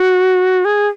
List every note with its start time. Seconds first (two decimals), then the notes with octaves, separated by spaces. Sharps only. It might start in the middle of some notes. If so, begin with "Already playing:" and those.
Already playing: F#4
0.65 G#4